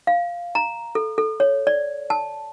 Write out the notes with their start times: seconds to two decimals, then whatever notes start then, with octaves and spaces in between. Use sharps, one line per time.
0.07 F5
0.55 A#5
0.95 A4
1.18 A4
1.40 C#5
1.67 D5
2.10 A5